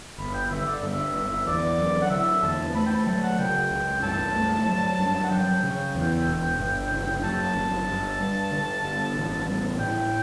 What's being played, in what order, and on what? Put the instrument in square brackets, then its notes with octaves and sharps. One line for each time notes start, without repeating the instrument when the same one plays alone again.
[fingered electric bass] G1 [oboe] B5
[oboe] G5
[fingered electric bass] D3 [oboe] E5
[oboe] D5
[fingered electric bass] G2 [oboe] E5
[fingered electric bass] G1
[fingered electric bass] E2 [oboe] D5
[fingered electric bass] F#3
[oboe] F#5
[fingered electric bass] D3 [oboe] E5
[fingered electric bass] E2 [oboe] A5
[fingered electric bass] A3 [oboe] B5
[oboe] G5
A5
[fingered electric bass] F#3 [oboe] A5
[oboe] F#5
[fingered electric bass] C#3 [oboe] G5
[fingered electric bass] C#2
[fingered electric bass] G2 [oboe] A5
[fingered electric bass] A3
F#3
G2
[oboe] F#5
[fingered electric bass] F#3 [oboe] G5
[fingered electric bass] C#3
E2
E1
G1
C#3
[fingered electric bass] F#2 [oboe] A5
[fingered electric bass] G1
G2
G3
D3
G2
A1
G3
[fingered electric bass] A2 [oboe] G5